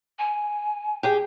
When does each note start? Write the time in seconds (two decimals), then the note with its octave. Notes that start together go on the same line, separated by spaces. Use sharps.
0.18 G#5
1.03 G4 G#4 G5